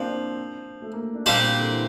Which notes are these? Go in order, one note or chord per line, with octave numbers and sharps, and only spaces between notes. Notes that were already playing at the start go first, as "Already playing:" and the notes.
Already playing: F3 A#3 C4 D4
A3
A#3
D4
A#2 G3 C4 D4 G4 C5
A#3
C4
D3
E3